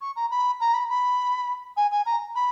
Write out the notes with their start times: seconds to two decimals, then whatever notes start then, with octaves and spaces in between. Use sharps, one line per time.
0.01 C#6
0.16 A#5
0.31 B5
0.60 A#5
0.74 B5
0.89 B5
1.77 G#5
1.92 G#5
2.06 A#5
2.35 B5